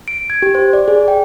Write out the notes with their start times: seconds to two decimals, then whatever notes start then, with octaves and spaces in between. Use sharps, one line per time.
0.08 D7
0.30 G#6
0.42 G4
0.55 C5
0.73 D5
0.88 G#4
1.08 G5